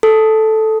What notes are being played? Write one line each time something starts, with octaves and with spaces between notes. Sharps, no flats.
A4